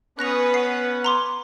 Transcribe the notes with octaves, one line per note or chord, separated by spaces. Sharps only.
B3 C#4 B4 C#6 D#6 F#6 A#6 F7
F#5 C7
A#5 C6 D6